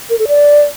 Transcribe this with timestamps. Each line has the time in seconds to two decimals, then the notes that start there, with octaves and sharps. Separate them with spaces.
0.10 A#4
0.19 A4
0.28 D5